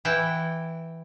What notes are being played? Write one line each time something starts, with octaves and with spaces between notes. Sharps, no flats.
E3 E4 F#5 G5